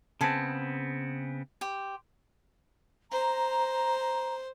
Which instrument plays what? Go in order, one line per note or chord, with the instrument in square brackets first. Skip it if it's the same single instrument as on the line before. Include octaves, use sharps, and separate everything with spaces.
[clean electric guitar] C#3 B3 C4 [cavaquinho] G#4 C5 A5
[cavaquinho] G4 C5
[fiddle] C5 [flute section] A#5